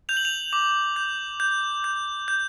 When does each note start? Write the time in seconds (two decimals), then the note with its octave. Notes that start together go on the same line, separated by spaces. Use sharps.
0.09 G6 F7
0.17 F#7
0.25 F7
0.53 D6
0.96 G6
1.40 G6
1.84 G6
2.28 G6